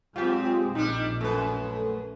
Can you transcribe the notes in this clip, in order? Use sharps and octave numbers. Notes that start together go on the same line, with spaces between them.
F#3 G#3 C4 F4 G4
A#1 G3 D4 D#4
F#2 A3 B4